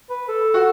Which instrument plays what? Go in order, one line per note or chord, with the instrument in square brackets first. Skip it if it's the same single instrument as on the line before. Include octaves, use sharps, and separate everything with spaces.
[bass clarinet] B4
A4
[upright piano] F#4